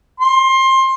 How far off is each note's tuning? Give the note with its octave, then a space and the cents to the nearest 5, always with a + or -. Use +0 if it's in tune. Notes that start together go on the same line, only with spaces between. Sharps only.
C6 +20